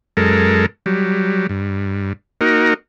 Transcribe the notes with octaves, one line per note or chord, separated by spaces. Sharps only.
F#2 G#3 A4 A#4
F#3 G3
G2
A#3 D#4 F#4 A#4